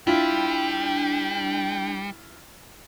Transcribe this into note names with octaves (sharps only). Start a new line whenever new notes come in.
G3 D4 E4 F4 G5